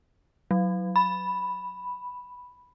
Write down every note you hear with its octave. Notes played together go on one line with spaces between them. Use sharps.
F#3
B5